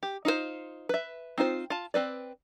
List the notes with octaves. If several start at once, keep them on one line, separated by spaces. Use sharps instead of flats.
G4
D#4 F4 F#4 C5
B4 E5
C4 D#4 F4 C5
F4 A5
C4 B4 D5